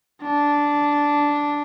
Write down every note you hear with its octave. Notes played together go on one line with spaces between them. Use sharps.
D4